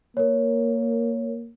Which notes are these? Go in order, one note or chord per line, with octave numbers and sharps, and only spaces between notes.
A#3 A#4 C#5